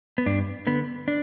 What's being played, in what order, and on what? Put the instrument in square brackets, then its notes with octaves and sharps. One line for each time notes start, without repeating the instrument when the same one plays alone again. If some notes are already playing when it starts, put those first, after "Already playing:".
[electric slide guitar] B3
G2 D4
D3 B3
D4